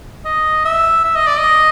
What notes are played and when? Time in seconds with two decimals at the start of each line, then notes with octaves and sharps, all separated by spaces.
0.25 D#5
0.65 E5
1.04 E5
1.15 D#5
1.27 D5
1.38 D#5